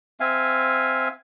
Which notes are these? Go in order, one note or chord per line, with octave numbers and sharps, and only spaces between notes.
C4 E5 F5 G#5